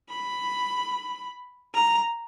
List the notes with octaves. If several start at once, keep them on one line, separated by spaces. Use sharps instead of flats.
B5
A#5